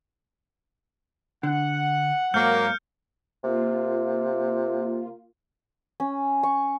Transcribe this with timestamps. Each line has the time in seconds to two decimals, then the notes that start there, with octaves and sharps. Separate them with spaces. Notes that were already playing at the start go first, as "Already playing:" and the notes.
1.43 D3 F#5
2.34 G#2 F#3 A#3 F6 G6 C#7
3.44 C3 A#3 F4
6.00 C#4
6.43 C#6